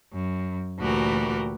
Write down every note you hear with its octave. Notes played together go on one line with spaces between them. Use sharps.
F#2
D2 A#2 E3 F#4 G4 A#4